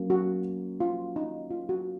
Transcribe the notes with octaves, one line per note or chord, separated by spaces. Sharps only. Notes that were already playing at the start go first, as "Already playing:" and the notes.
Already playing: F#3 A#3 C#4
F#4
F4
D#4
F4
F#4